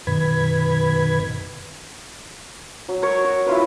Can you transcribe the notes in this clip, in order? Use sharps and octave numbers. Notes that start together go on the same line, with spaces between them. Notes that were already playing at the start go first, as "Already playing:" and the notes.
F#2 B2 D#3 B4 B5 G#6
F#3
A#4 C#5
F#4
E4 F4 B4